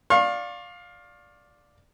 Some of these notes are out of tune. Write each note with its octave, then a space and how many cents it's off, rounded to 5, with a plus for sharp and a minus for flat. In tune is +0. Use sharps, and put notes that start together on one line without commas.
D5 +0 F5 +15 C#6 -40